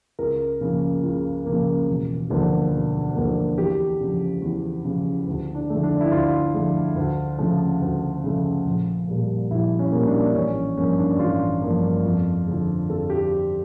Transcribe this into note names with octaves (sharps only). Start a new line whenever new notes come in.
C#2 A#4
C#3 F3 A#3
C#2
C#3 F3 A#3
E1
D2 D3 F3 A#3
E1
D2 D3 F3 A#3
E2 G4
C#3 F3
E2
C#3 F3
D2
D4
D3 F3 A3
D4
E4
D2 F4
D3 F3 A3
D2
C#3 F3 A3
D2
C#3 F3 A3
A#1
A#2 G3 A#3
A#1 E4
C#4
A#2 G3 A#3
D4
D4
A1 C#4
G2 F3 A#3 C#4
D4
A1 F4
G2 F3 A#3
F2
D3 F3
F2 A4
G4